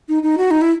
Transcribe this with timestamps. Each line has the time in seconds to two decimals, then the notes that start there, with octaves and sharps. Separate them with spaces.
0.09 D#4
0.23 D#4
0.38 F#4
0.51 D#4
0.61 E4